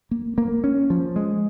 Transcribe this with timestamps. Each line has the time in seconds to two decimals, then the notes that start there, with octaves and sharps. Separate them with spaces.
0.11 A#3
0.38 A#3
0.64 C#4
0.90 F3
1.16 G#3